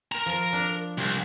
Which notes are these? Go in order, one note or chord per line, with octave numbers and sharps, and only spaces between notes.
A#4 A#5
F3
D4
C2